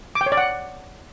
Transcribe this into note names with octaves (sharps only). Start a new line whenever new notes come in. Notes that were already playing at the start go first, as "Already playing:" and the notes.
D6
G5
C#5
D5
F#5